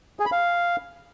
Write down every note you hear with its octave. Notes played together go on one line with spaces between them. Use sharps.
G#4
B5
F5